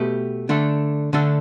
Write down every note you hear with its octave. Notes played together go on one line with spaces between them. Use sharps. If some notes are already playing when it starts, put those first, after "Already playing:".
Already playing: B2 A3 G4 B4
D3 A3 D4 A4
D3 A3 D4 A4